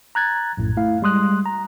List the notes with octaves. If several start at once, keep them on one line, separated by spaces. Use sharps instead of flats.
A#5 F#6 G#6 A6
A#1 F#2 A2
A3 E4 F5
G3 G#3 C6 D#6 F#6
A#5